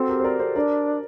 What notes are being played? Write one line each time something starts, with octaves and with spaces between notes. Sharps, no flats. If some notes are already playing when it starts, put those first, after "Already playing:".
Already playing: C4 F#4 A4
G4 A#4
C5
A#4 D5
A4 C5
D4 A#4 D5